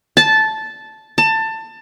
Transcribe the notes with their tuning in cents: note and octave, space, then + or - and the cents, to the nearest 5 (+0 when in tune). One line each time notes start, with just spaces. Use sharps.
A5 -10
A5 +20